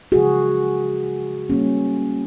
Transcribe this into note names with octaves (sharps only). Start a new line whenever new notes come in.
C#3 F3 G#3 F#4 G#4
G3 A#3 C#4